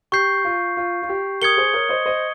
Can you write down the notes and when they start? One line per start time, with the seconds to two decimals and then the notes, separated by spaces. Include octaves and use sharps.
0.12 G4 C#6 G6 C7
0.45 F4
0.77 F4
1.02 F4
1.09 G4
1.42 G4 A#4 D#6 G#6 C#7 G7
1.57 G#4 C5
1.74 A#4 C#5
1.89 C5 D#5
2.06 C5 D#5